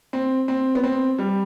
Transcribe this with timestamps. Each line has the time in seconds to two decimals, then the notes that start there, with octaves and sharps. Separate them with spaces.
0.13 C4
0.48 C4
0.75 B3
0.84 C4
1.19 G3